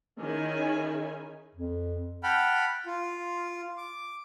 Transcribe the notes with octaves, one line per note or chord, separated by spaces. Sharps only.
D#3 C#4 E4 G#4 G#5
F2
F#5 G5 A5 B5 F6
F4
D6